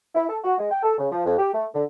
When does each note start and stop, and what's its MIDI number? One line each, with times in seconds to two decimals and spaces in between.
0.15 0.25 64
0.29 0.38 69
0.44 0.57 66
0.58 0.71 56
0.71 0.81 79
0.83 0.93 69
0.98 1.08 49
1.12 1.26 53
1.26 1.36 41
1.38 1.51 67
1.53 1.66 57
1.74 1.83 50